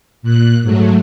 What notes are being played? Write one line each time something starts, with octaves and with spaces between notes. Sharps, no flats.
A#2 F#6
G#2 F#3 A3